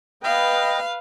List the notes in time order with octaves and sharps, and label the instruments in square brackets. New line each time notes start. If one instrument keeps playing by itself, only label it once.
[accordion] B3 D#5 G5 [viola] B4 F5